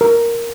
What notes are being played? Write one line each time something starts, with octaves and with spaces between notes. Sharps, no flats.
A#4